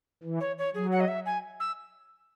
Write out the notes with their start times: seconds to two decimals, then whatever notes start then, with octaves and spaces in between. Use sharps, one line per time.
0.24 E3
0.40 C#5
0.58 C#5
0.74 F#3 G#4
0.92 F#5
1.00 D#5
1.08 E5
1.26 G#5
1.60 E6